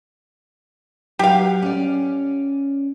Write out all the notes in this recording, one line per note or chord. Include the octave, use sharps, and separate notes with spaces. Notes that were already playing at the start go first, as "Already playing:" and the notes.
F#3 G4 F5
C#4 D5